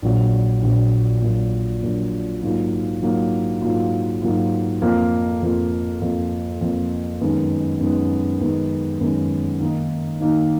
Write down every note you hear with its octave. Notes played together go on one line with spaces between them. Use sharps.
A#1 A#2 F#3
A#1 A#2 F#3
A#1 A#2 F#3
A#1 A#2 F#3
G#2 F#3 A#3 F4
G#2 F#3 A#3 F4
G#2 F#3 A#3 F4
G#2 F#3 A#3 F4
F2 F3 A#3
F2 F3 A#3
F2 F3 A#3
F2 F3 A#3
F#2 D#3 G#3 B3
F#2 D#3 G#3 B3
F#2 D#3 G#3 B3
F#2 D#3 G#3 B3
D#3 A#3 D#4
D#3 A#3 D#4